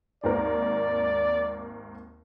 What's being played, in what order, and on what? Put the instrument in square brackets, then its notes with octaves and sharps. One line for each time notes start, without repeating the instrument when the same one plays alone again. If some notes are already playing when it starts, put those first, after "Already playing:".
[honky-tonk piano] G#1 D#2 A#4 [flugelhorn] D5